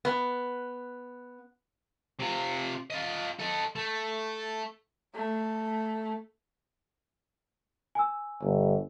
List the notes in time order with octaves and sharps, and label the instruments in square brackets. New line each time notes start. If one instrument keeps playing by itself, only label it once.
[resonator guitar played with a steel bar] B3
[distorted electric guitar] C3 F4
F4 D#5
A4 D#5
A3
[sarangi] A3
[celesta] G#5 E6
[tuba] G1